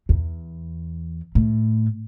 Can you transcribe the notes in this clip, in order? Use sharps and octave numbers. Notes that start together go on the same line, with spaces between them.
E2
A2